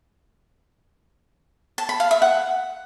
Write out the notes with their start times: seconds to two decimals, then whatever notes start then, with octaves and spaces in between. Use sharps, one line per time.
1.78 A5
1.89 B5
2.00 F5
2.11 E5
2.22 F#5